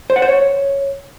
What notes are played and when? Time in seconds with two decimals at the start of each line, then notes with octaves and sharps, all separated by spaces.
0.10 C5
0.16 F#5
0.22 C5
0.28 C#5